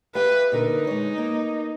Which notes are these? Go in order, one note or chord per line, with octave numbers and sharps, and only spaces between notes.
G4 B4 E5 F5
A#2 D3 D#4 A#4
G#3 C#5
A#3